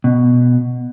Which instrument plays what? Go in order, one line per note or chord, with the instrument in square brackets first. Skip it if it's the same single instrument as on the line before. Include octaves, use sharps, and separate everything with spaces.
[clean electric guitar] B2